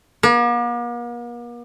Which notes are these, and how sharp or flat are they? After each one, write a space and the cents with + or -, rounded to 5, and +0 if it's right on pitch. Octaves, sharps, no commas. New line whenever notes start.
A#3 +45